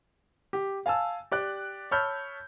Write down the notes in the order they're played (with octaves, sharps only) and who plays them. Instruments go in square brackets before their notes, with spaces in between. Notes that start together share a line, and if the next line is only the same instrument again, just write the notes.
[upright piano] G4
F5 G#5 A5 E6
G4 D5 F#6
C#5 A5 B5 E6 F6 G6